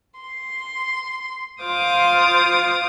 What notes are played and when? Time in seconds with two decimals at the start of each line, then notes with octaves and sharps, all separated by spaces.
0.20 C6
1.62 F4 C5 F5 D6 D#6